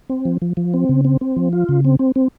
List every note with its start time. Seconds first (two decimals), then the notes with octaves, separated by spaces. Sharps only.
0.09 C4
0.25 F3
0.42 F3
0.57 F3
0.74 C4
0.89 C#3
1.05 C4
1.21 C4
1.36 F3
1.53 F4
1.69 C#3
1.85 C4
1.99 C4
2.16 C4